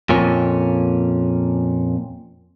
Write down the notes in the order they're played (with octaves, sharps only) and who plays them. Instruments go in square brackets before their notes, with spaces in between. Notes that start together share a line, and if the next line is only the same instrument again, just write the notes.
[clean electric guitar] F2 A#2 C#4